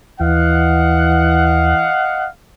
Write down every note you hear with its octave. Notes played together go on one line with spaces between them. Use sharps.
D#2 E3 D#5 F5 F#5